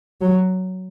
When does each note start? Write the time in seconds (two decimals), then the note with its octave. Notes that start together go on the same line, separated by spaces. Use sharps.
0.21 F#3